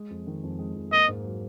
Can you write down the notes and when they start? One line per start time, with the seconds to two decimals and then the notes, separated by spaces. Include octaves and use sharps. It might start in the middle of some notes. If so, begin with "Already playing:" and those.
Already playing: G#3
0.10 F2
0.27 D#3
0.43 F2
0.59 G#3
0.75 F2
0.92 A#3 D#5
1.08 G#2
1.25 F#3